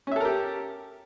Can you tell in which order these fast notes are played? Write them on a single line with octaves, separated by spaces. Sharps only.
C#4 E5 A4 A#4 G4